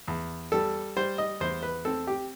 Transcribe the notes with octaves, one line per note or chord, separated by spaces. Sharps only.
E2
G3 A4
G3 C5
D#5
E2 C5
B4
C4 A4
G4